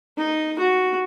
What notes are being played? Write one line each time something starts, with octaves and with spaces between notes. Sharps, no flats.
D#4
F#4